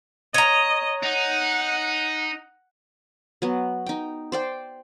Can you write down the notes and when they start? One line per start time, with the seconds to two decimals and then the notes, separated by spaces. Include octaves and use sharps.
0.34 C#5 D#5 A#5
1.03 D#4 F#5
3.42 F#3 B3
3.86 D#4 G5
4.32 C5 D5 G5